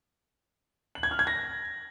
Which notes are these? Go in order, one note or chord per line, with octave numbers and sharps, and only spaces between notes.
F#7
G#6
F6
G#6
A#6